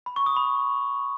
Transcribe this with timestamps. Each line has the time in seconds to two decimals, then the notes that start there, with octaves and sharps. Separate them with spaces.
0.06 B5
0.16 C#6
0.26 D#6
0.36 B5